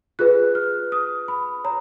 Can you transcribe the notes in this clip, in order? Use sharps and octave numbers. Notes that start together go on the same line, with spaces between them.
F4 G#4 B4 F#6
F6
D#6
B5
C#5 A#5